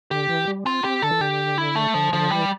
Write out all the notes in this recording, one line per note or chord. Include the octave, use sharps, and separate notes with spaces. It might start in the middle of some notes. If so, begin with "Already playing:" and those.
D3 G4
E3
G3
C4 F4
C4 G4
D3 A4
E3
D3 G4
E4
A3
D3 F3
D3 F3
E3 G3